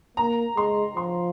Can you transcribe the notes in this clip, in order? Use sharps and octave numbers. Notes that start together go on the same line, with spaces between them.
A#3 A#5
G#3 C6
F3 C6